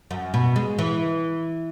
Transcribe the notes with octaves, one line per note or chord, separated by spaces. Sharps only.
F#2
B2
G#3
E3